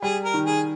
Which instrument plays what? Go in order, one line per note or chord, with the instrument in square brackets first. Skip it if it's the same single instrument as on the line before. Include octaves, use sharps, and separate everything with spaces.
[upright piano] G3 [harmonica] G#4
[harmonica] A#4
[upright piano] D#3
[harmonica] G#4